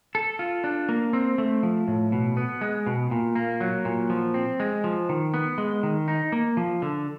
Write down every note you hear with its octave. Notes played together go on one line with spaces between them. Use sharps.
A4
F4
D4
A#3
C4
A3
F3
A2
B2
B3
G#3
B2
A#2
A#3
F#3
A#2
F3
C4
G#3
F3
D#3
B3
G#3
D#3
D#4
A#3
F3
D3